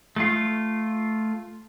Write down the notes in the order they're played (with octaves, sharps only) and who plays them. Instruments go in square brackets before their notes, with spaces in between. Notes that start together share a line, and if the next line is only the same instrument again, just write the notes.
[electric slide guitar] A3 F4